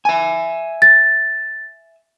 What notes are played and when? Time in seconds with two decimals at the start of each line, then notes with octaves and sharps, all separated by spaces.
0.05 E5 G#5
0.82 A6